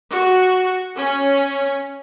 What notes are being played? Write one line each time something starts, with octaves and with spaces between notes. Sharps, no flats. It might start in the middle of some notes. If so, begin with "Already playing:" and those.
F#4
C#4